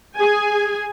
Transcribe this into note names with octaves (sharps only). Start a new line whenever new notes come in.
G#4 G#5